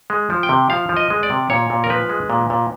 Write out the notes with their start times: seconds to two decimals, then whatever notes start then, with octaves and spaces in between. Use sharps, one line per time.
0.10 G#3
0.30 F3
0.43 G5
0.49 C3
0.70 F3 F5
0.89 F3
0.97 D#5
1.10 G#3
1.23 D5
1.30 C3
1.50 A#2 C#5
1.70 A#2
1.84 A#4
1.90 F3 B4
2.09 G#3
2.30 A#2
2.50 A#2